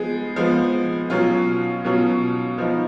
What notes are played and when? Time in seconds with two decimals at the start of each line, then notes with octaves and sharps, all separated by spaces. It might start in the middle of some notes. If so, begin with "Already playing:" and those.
Already playing: F3 G#3 B3 G#4
0.36 F3 G#3 B3
1.10 B2 F#3 C#4 F4
1.85 B2 F#3 C#4 F4
2.58 F3 B3 D#4